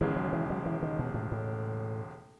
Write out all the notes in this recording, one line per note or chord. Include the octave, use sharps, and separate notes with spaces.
E1 D#2 C#3 E3 G#3
F#3
E3
F#3
E3
D#3
B2
A2
A2